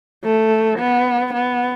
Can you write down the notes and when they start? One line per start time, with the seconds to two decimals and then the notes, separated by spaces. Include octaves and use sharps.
0.24 A3
0.79 B3
1.34 B3